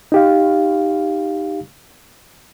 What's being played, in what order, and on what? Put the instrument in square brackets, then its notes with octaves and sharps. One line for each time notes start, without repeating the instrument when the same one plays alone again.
[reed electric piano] D#4 G4 F5